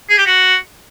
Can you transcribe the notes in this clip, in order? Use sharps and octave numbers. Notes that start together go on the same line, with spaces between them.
G#4
G4
F#4